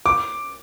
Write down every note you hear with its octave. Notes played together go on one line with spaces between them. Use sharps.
D6